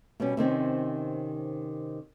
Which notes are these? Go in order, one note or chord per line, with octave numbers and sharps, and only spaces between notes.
B2 G3 B3 C#4
C3 D#3 C4 C#4